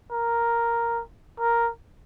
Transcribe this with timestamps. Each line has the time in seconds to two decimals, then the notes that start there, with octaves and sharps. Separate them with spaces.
0.12 A#4
1.40 A#4